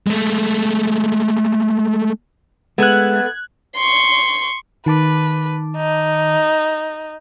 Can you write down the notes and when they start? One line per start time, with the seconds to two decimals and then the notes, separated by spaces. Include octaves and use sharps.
0.07 G#3 A3
2.78 G#3 A3 B3 F#6 G#6
3.76 C6 C#6
4.86 D#3 B4 A5 D6
5.77 D#4